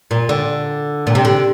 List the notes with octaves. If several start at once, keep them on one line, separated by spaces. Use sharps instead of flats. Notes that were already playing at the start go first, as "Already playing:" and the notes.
A#2
D3
A#2
C3
D3